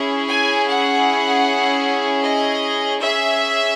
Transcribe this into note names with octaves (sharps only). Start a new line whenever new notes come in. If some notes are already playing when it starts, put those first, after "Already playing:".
Already playing: C#4 E4 G#4
G#5
F#5
D#5
C#4 G#4 E5